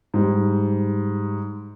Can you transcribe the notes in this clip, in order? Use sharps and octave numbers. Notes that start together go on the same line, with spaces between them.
G#2 G3